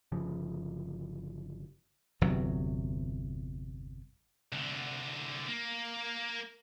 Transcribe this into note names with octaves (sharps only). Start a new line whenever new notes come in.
G1 C#3 F3
G1 E2 C3 F#3
C2 D3
A#3